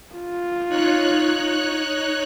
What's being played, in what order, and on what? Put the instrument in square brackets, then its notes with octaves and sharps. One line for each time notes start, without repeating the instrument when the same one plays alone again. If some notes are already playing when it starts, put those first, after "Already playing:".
[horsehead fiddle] F4
[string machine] D#4 C#5 F#6